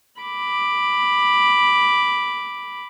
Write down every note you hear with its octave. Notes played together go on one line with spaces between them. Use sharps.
B5 D6